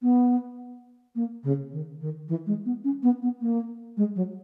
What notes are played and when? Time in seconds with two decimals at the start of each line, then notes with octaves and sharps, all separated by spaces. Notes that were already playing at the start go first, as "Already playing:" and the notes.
0.02 B3
1.15 A#3
1.43 C#3
1.72 D#3
2.01 D#3
2.28 E3
2.46 G#3
2.65 B3
2.84 C#4
3.03 B3
3.22 B3
3.41 A#3
3.97 G#3
4.16 F#3